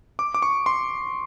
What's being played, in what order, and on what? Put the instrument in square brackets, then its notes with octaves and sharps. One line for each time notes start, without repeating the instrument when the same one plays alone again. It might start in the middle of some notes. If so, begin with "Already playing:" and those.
[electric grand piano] D6
D6
C#6
C6